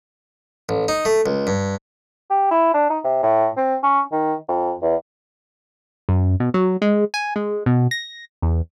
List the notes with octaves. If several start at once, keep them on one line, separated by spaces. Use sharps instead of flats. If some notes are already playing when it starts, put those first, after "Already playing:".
A1
D#4
A3
C#2
G2
G4
E4
D4
D#4
C3
A2
C4
C#4
D#3
F2
E2
F#2
B2
F#3
G#3
G#5
G#3
B2
A#6
E2